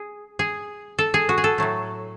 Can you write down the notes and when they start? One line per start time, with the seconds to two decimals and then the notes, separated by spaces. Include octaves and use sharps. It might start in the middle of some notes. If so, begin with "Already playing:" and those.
Already playing: G#4
0.39 G#4
0.99 A4
1.14 G#4
1.29 F#4
1.38 G#4
1.44 A4
1.58 A2 F#3 A3